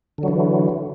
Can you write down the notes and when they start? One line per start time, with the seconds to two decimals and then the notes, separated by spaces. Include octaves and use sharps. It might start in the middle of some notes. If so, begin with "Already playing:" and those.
0.18 D3
0.23 F#3
0.28 E3